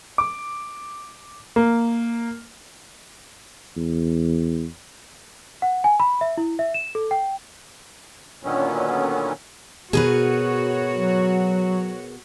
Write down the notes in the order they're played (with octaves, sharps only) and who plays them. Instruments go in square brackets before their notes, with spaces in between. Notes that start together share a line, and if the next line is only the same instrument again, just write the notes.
[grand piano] D6
A#3
[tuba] E2
[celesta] F#5
G#5
B5
E5
E4
E5
E7
A4
G5
[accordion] A#2 D3 D#3 F#3 B3 C#4
[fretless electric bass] B2 [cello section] F#4 C#5 [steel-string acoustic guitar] G#4 A#4 B4
[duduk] F#3